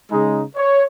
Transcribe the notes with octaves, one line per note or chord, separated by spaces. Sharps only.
C#3 G#3 D#4 G#4
C#5